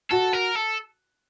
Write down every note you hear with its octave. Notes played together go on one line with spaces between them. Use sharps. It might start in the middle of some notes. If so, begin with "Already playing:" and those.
F#4 A4
A#4
A4